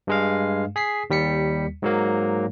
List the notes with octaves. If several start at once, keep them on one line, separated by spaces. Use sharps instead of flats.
G2 G#3 F5
G#4 B6 C7
D#2 G3 B6 C#7
G#2 F#3 A#3